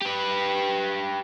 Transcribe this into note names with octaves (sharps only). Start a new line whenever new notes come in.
G4 B4